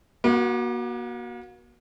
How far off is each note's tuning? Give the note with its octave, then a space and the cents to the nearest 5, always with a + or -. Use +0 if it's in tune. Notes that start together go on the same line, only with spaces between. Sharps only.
A#3 +40 F#4 +0